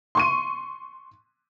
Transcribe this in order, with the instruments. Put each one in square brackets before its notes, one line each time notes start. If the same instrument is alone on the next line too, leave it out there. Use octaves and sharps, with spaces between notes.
[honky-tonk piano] C6 C#6 D#7